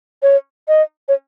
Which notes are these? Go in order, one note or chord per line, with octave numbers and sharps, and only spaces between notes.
C#5
D#5
C#5